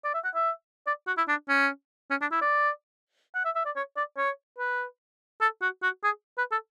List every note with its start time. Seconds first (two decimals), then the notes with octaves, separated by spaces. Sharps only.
0.04 D5
0.14 E5
0.24 F#5
0.35 E5
0.87 D5
1.07 F#4
1.17 E4
1.28 D4
1.49 C#4
2.10 C#4
2.21 D4
2.32 E4
2.41 D5
3.35 F#5
3.45 E5
3.55 E5
3.65 D5
3.76 C#5
3.97 D5
4.17 C#5
4.58 B4
5.41 A4
5.62 F#4
5.83 F#4
6.04 G#4
6.38 B4
6.52 A4